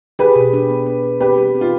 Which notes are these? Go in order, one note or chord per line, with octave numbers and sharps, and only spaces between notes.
G4 G#4 B4
B2
D4
B3
B3
G#4
C4 G4 B4
G3
C4
F4